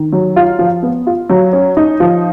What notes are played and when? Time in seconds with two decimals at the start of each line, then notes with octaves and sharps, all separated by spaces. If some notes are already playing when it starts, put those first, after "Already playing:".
Already playing: D#3
0.12 F#3
0.36 F4
0.59 F3
0.83 B3
1.07 F4
1.30 F#3
1.53 C#4
1.77 D#4
2.00 F3